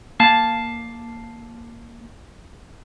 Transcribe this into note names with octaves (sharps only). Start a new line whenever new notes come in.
A#3 F5 A5